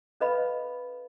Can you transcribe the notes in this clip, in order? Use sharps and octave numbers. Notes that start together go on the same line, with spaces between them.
C#4 A4 B4 D#5 F5 B5